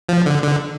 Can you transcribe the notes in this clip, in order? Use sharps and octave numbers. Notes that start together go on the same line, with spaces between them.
F3
D3
D3